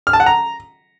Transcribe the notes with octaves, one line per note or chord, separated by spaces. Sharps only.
F6
A5
F#5
A#5